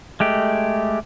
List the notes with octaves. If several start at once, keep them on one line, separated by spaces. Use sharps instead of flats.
G#3 A3 G4